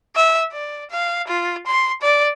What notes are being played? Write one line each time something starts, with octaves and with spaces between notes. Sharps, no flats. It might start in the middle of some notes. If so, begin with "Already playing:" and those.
E5
D5
F5
F4
C6
D5